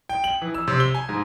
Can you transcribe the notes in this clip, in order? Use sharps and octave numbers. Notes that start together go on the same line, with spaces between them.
G5
F#7
E3
E6
C3
G7
G#5
G#2